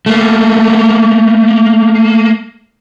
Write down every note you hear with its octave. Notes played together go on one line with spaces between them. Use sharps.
A3 A#3